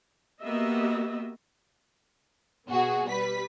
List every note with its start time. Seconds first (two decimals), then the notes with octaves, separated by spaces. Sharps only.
0.41 A#3 B3 F#4 G4 D#5 E5
2.69 B2 B3 F#4 G#4
3.07 G3 B4 B6